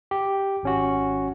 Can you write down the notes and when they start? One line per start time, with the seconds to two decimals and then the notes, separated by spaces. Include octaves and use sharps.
0.11 G4
0.63 G#1 C#4 F#4